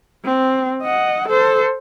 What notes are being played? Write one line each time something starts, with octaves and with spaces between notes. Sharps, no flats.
C4
D#5 F#5
A4 C5